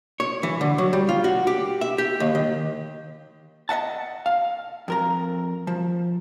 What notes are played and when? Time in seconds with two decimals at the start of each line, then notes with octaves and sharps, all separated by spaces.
0.20 C#5
0.43 E3
0.61 D3
0.78 F#3
0.93 G3
1.09 F4
1.24 F#4
1.47 G4
1.81 E5
1.98 G4
2.20 D#2
2.35 D#3
3.69 D#5 E5 F#5 A5
4.26 F5
4.88 F2 A#4 A#5
5.67 F3